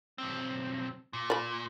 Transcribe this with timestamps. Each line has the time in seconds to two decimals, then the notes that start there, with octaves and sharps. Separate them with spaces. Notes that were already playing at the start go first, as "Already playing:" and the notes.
0.18 B1 C4
1.13 A#2
1.30 D5 B5